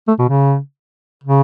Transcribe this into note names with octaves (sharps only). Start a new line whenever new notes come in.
A3
B2
C#3
C#3